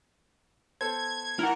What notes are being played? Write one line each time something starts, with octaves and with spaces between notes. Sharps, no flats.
B3 A4 C5 G#6
E4 A#4 F#5